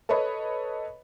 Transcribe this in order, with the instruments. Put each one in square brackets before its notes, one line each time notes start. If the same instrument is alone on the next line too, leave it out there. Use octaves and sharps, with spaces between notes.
[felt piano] A4 B4 C#5 D#5 B5